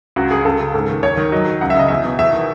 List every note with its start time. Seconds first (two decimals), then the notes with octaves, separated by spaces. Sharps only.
0.16 C#2 F#4
0.31 C#3 G#4
0.45 C#2 A4
0.59 C#3
0.74 G#2 A4
0.89 D#3
1.03 D#2 C#5
1.17 D#3
1.32 F#3 D#5
1.46 F#3
1.61 C#2 F#5
1.70 E5
1.76 C#3 D#5
1.88 E2 E5
2.05 B2
2.19 E2 E5
2.33 D#3